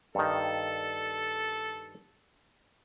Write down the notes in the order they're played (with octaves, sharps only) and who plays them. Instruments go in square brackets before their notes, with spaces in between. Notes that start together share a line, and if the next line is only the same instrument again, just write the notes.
[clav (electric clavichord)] G2 D#3 [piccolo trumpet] A4